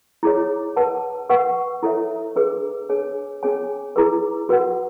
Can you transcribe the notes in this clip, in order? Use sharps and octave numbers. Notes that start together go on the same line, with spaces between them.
E4 G#4 C#5
B4 F#5 A5
B4 F#5 C#6
E4 A4 C#5 E5
D4 G#4 B4
D4 G#4 C#5 G#5
C#4 G#4 C#5 G#5
E4 G#4 B4
F#4 B4 F#5